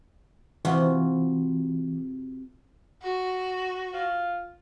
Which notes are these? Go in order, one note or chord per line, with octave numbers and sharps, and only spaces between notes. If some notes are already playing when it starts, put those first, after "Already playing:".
C3 E3 F4 F#4
F#4
F4